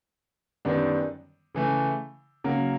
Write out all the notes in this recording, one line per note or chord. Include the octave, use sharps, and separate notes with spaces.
F#2 D#3 G3 B3 D4
C#3 E3 A3
C#3 F#3 A#3